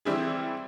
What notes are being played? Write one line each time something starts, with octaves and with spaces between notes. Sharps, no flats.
E3 G3 C4 E4 G#4